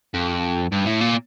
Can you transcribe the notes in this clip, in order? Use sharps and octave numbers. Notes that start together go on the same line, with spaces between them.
F2
G2
A2
A#2